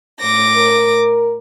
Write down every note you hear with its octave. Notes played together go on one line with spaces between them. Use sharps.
A2 D6 A#6
A#4